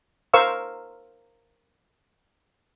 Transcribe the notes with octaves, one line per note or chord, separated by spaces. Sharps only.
A#4 C5 F5 C#6 E6